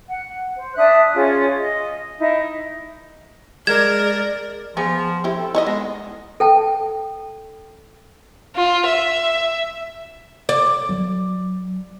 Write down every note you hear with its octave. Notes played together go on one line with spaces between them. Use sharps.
F#5
C5
D4 E5 D#6 F#6
C#4 F4 G#4 C#5
D#5
D#4 E4
G#3 A#4 D5 G#6 E7
F3 B3 G#4
C4 E4 G4
A4
D#4 E4 C#5 D#5
G#3 B3
A4 G5 A5
F4
E5
D5
F#3